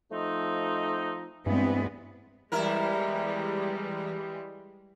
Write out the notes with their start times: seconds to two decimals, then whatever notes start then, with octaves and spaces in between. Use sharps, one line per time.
0.12 F3 A3 C4 D#4
1.46 G2 E3 G#3 B3 C4
2.52 E2 E3 G3 G#3 E4 A#4